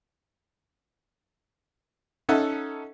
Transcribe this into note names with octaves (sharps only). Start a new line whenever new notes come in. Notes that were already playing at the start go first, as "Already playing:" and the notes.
C#4 D#4 A4 E5 F#5 A5